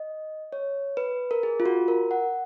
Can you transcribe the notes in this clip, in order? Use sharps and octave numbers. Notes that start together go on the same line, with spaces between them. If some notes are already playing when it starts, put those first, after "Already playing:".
Already playing: D#5
C#5
B4
A#4
G#4
F4
F#4
A#4
F#5